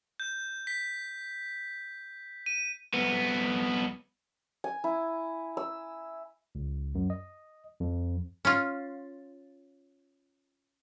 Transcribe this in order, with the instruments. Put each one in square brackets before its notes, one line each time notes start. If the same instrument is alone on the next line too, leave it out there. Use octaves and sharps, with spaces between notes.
[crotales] G6
B6
D#7
[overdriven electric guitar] C2 B3
[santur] G#5
E4
E6
[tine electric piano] C#2
F#2
D#5
F2
[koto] C#4 F4